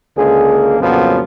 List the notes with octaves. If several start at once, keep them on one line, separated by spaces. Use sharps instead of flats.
C#2 D3 G#3 A#3 G#4
F2 A#2 C#3 F3 F#3 B3